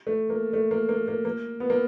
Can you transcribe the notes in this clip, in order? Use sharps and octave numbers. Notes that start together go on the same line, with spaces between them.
A3
A#3
A3
A#3
A#3
A#3
A#3
B3
A#3